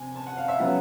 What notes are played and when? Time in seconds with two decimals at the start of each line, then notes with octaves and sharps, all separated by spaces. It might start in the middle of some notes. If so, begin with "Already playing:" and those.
Already playing: C3 G#5
0.16 A5
0.27 F#5
0.37 F5
0.48 E5
0.59 C#3 F#3 B3 F#5